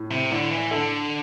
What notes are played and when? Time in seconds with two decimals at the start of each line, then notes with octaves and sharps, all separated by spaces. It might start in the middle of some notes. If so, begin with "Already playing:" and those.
Already playing: A2
0.11 C3
0.31 A2 D3
0.51 E3
0.71 D3 A4